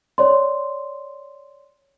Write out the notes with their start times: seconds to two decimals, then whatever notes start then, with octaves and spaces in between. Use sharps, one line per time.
0.18 C#5 D5 C6